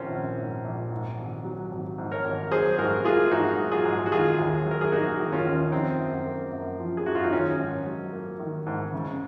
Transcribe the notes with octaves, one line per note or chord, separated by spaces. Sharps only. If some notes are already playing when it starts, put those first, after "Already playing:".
Already playing: A#1 D#3 C4 C#4 F4
A#1
G#2
A#1
G#2
G#1
F#3
G#1
G#2
A#4 C#5
G#1
F#3 G#4 C5
G#2 F#4 A#4
A#3 F4 G#4
G#2 D#4 F#4
F#3
F4 G#4
G#2
F#4
D#3 F4 G#4
D#2
F#3
A#4
G#4
A#3 D#4 F#4
D#3
C#4 F4
D#2
F3 C4 D#4
F#2
A#3
F#2
F3
G#4
F#2 F#4
F4
D#4
D#3 C#4
G#2
F#3
A#3
D#3
G#2
C#3